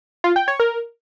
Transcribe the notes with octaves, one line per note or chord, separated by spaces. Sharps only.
F4
G5
C#5
A#4